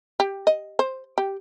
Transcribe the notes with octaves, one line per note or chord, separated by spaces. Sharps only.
G4
D#5
C5
G4